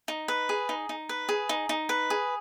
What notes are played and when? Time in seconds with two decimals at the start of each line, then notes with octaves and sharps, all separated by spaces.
0.08 D#4
0.28 B4
0.49 G#4
0.69 D#4
0.89 D#4
1.09 B4
1.29 G#4
1.49 D#4
1.69 D#4
1.89 B4
2.10 G#4